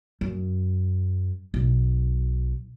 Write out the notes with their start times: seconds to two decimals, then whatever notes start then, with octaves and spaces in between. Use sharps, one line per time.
0.21 F#2
1.54 B1